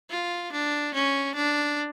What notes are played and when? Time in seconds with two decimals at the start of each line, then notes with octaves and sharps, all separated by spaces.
0.10 F4
0.52 D4
0.94 C#4
1.35 D4